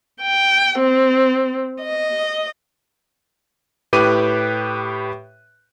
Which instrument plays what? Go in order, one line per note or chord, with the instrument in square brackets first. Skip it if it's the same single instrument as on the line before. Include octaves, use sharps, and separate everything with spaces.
[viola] G5
C4
D#5
[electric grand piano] A2 G4 B4 D6 F#6 D#7